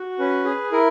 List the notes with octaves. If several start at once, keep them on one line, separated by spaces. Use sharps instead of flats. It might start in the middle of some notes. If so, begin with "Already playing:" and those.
Already playing: F#4
C#4 B4
G#4
E4 A#4